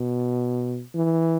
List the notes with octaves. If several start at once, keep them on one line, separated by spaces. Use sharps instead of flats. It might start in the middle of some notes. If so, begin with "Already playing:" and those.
Already playing: B2
E3